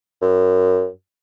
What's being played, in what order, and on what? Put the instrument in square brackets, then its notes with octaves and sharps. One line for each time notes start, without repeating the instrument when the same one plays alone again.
[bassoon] F#2